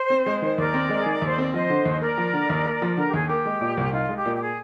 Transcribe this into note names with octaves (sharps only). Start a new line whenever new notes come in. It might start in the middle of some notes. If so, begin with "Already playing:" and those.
Already playing: C5
C4
G#3
D#3
D#2 A#4 D5
C4
G#3
G#4
D#3
A#4
D#2 C5
C4 D5
F3 C5 D#5
D3
D#2
D#5
A#3 A#4 D5
F3
D3
D#2
A#3
F3
D3 A#4
G4
D#2 G#4
A#3 G4
G#3
A#2
C2
D#4 F4
G#3
G4
A#2
G4
G#4